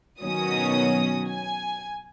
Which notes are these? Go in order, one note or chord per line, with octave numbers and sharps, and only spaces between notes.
B2 D#3 F#3 C#4 D#6
G#5